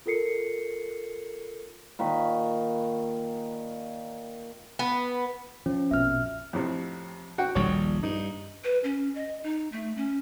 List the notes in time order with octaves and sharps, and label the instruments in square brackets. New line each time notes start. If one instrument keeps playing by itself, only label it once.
[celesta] F4 A4 A#4 C7 C#7
[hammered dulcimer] A#2 D#3 B5 C#6
[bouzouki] B3
[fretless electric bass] F3 [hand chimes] C#4
[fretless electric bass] A#1 F2 B2 [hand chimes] E5 F6
[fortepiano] F2 A2 C3
F#4 F#5 G5
[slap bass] D#1 A#1 G3 [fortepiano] C#5
[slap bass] G2 [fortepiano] D#4
[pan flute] B4
C#4
D#5
D#4
A3
C#4